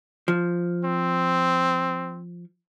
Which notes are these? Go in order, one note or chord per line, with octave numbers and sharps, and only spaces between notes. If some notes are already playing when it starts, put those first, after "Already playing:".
F3
C4